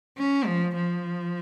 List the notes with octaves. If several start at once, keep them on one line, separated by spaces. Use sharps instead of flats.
C#4
F3
F3